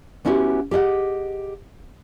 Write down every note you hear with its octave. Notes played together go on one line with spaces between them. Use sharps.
B3 C#4 D4 E4 F#4 G4
G4 G#4 D#5 F#5